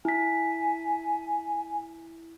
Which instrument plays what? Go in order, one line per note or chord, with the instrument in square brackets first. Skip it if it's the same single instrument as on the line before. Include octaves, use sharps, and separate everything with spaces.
[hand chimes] E4 B6 [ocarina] G#5